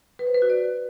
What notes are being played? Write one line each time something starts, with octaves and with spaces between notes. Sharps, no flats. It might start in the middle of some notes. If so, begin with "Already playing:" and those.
B4
C5
B4
F#4
D5